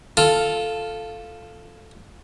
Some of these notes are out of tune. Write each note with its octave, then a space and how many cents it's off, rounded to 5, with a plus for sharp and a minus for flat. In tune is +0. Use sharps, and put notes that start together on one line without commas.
F4 +0 A4 +0